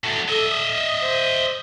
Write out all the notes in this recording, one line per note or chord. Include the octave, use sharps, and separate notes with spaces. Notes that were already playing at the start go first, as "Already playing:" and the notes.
F#3 A3
A4 D#5 E5
D#6
C5